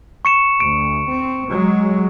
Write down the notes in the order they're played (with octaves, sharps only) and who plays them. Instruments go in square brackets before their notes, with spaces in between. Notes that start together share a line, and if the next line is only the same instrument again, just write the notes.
[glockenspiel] C#6 C#7 E7
[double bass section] D2 [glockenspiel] D7
[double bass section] C4
F#3 G#3